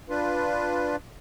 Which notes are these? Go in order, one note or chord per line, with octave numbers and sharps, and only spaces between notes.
D4 F4 B4